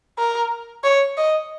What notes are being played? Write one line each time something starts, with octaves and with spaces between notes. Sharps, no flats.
A#4
C#5
D#5